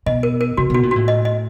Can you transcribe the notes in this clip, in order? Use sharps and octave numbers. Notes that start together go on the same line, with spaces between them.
B2 D#5
A#4
A#4
C3 F#4
B2 F#4
A#2
A2 F#4
D#5
D#5